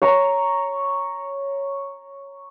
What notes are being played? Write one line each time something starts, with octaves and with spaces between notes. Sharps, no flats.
C#5 A#5